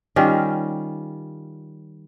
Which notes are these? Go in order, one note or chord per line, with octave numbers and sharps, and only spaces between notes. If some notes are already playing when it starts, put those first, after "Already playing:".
D#3 G3 C#4 F4